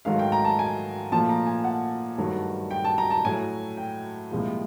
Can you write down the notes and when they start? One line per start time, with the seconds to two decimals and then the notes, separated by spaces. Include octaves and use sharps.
0.05 G#2 D#3 F#3 A3 F5
0.19 G5
0.32 A#5
0.45 A5
0.59 G#5
1.12 A#2 F3 A3 A5
1.29 A#5
1.47 G#5
1.64 F#5
2.18 G2 D#3 F#3 A3
2.71 G5
2.84 A5
2.98 A#5
3.10 A5
3.25 A2 F#3 A3 G#5
3.77 G5
4.31 C2 A#2 F3 G#3